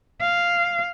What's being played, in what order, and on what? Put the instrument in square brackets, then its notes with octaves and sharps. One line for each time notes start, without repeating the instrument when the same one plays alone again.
[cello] F5